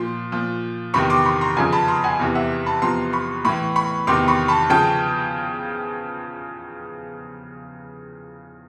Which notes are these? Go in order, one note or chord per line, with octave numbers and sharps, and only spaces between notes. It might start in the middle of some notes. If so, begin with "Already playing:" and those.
Already playing: A#2 F3 C6
A#2 F3
E2 C3 D#3 B5 C#6
C6 D6
B5 C#6
A#5 C6
F2 C#3 F3 G#5 A#5
A5 B5
A#5 C6
F#5 G#5
E2 C3 E3
E5 F#5
A5 B5
E2 C3 F3 A#5 C6
B5 C#6
A2 E3 B5 C#6
B5 C#6
E2 C3 D#3 C6 D6
B5 C#6
A5 B5
C#3 F3 G5 A5